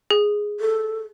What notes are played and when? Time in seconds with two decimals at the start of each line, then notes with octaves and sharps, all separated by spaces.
0.11 G#4
0.60 A4